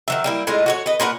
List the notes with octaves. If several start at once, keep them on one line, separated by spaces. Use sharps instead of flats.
D#3 F#3 E5
G3 A#3 E4
A2 G#3 D#4 F4
F#4 G4 C#5
B4 D#5
A#2 A#4 B4 F#5